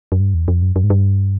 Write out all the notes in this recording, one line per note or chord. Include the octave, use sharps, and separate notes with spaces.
F#2
G2
E2
F2
F#2
F#2
G#2
G2